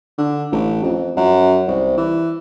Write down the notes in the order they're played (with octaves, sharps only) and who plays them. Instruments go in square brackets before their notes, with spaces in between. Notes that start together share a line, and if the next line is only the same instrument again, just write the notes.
[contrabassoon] D3
A1
F2
F#2
C2
E3